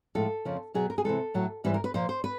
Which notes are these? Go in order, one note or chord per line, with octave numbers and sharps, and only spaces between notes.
A2 F3 G#3 A4
F2 C#3 F3 A#3
B2 F#3 B3 G#4
A#4
G#4
C3 E3 G#3 A4
A2 F#3 A3
G#2 E3 G3 B4
A#4
B4
A#2 F3 A#3 C5
C5
B4